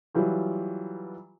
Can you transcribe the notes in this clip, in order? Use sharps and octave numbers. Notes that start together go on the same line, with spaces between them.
E3 F#3 G3 F4